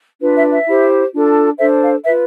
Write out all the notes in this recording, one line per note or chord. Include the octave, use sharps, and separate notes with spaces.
D4 F4 B4
E5
E5
E4 G4 C5
D4 F4 A4
D4 A4 C5 E5
F5
F4 B4 E5